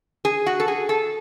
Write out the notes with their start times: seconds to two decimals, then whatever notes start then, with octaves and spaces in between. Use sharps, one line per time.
0.25 G#4
0.46 F#4
0.60 A4
0.68 G#4
0.89 A4